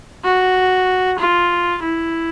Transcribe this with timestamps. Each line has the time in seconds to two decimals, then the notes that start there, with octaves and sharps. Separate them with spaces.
0.24 F#4
1.19 F4
1.83 E4